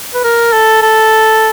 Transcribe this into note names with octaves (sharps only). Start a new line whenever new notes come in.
B4
A#4
A4
A4